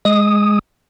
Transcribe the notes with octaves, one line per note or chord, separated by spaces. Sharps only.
G#3 D#6